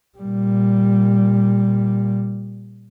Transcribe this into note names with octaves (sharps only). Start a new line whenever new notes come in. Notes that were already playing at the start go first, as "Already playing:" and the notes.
A#2 G3